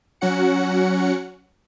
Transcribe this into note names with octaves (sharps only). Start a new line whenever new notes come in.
F#3 C#4 F#4 F#5 C#7